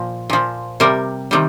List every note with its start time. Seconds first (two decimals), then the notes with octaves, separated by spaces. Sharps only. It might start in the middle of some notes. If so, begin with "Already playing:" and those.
Already playing: A#2 F3
0.30 A#2 F3
0.80 C3 G3 A#4
1.31 C3 D#3 G3